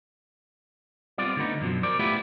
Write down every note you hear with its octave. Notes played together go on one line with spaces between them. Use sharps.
G3 B3 C4 F4 D5
D3 A3 B3 D#4
F#2 B2 F3
A#4 C5 D5
A3 B3 E4 F4 G4